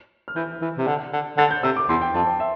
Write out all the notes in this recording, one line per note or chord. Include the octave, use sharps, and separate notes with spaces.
F6
E3 G6
E3
C3
D3
D3
D3 A6
G6
C3 E6
D6
E2 C6
G5
F2 A5
G5
E5